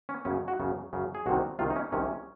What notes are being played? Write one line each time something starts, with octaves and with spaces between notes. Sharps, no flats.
C#4
F#2 C#3 C#4
F#4
F#2 C#3
F#2 C#3
G#4
C2 C3 D#3 F#4
C2 C3 D#3 F4
D#4
C#4
C2 C3 D#3 C#4